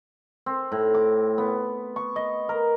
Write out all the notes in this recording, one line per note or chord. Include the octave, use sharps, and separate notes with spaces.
C4
A2
D6
B3
C#6
D#5
A#4